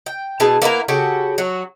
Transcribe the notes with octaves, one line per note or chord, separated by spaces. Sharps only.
G5
B2 E4 G#4 A5
A#3 B3 E4 A#4
C#3 F#4 G4 A4
F#3 F#4